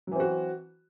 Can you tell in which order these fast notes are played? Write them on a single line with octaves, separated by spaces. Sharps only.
F#3 E3 C4 F#4